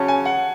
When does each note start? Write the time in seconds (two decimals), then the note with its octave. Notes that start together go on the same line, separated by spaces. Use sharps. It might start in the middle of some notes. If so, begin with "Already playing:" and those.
Already playing: C#3 F#3 C#4 A5
0.08 G#5
0.25 F#5